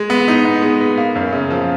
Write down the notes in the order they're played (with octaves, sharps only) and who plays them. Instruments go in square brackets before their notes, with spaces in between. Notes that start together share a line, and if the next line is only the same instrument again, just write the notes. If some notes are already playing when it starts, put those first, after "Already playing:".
Already playing: [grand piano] G#3
B3
D#4
B3
G#3
B3
A#3
F#2
C#3
F3